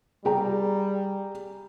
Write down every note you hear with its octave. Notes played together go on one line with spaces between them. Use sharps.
G3 G#4 G5 A#5